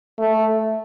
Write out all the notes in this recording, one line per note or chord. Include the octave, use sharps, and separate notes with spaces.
A3